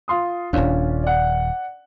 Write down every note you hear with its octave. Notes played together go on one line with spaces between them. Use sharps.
F4 C6 D#6
D#1 D#2 C#4 D4 F4
D5 F#5